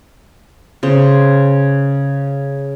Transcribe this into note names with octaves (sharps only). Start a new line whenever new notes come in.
C#3 C5